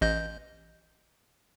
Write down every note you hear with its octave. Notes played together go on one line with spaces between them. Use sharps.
A1 D#5 G6